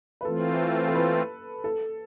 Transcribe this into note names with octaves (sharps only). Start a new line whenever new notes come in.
B4
E3 A3 C4 F4 A4
A4
B4
A4